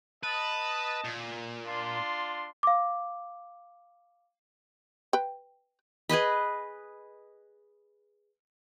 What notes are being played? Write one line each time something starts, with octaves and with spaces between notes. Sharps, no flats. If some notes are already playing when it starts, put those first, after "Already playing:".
B4 D#5 A5
A#2
D4 F4 C6
F5 D6
B4 G5
G#4 B4 D#5 B5